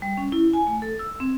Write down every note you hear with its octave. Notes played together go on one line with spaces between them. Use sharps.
G3
C#4
E4
G#5
A3
A4
E6
C4